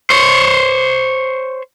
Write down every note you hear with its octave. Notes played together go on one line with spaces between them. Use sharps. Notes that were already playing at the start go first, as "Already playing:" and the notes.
C5 C#5